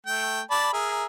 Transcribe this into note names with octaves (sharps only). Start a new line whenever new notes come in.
A3 G5
D5 A5 B5
G#4 A#4 E5